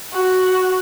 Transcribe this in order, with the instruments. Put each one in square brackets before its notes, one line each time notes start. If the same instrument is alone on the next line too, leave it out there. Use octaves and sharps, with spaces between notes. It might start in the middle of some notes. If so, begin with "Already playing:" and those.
[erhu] F#4